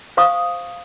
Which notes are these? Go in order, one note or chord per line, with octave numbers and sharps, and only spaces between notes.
C5 F5 C#6 D#6